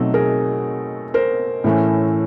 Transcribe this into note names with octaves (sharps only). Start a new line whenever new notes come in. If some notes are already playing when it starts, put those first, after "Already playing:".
Already playing: B2 F#3 A3 C4 D#4 A4
G#4 A#4
A#4 C5
A2 E3 A3 C#4